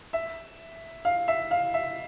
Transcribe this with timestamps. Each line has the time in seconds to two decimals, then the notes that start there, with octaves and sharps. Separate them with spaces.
0.13 E5
1.05 F5
1.28 E5
1.51 F5
1.74 E5